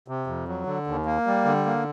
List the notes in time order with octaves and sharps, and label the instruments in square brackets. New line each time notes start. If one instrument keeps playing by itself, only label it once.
[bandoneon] C3
F2
F#3
D3
D#2
A#3
G3
D3
A#3